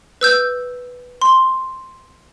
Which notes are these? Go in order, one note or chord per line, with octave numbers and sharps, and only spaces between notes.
B4 E6 G6
C6